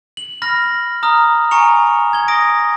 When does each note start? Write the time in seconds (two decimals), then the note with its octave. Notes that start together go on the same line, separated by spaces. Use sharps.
0.17 F#7
0.42 B5 F6 A#6
1.03 A#5 D#6 F6
1.51 G#5 A#5 C#6 C#7 F7
2.13 G#6 G7
2.28 D#6 A#6 D7